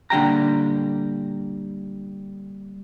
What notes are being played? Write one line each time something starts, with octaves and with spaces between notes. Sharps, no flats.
A#2 D3 G3 G5 A#5